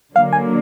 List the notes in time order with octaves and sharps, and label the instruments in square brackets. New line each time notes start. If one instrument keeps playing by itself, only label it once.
[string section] D3 F#3 A#3 [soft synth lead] F5
[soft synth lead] G#5